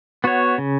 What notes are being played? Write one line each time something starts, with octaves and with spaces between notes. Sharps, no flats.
B3 F#4 C#5
C#3